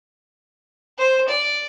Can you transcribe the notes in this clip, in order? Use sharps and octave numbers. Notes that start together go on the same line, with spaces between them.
C5
D5